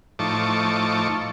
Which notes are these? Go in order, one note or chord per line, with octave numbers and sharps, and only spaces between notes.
A2 F3 D#4 A5 C#6 D6